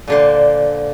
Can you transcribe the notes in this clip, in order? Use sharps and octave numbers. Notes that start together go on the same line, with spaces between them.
A#2 D3 C5